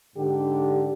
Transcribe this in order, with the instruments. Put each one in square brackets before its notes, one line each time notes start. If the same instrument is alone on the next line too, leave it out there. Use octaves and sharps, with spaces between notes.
[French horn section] G#2 D3 G4